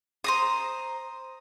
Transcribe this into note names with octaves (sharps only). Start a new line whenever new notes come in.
C5 A#5 D#6